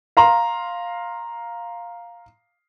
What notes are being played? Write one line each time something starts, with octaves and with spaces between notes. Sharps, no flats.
F5 A#5 C6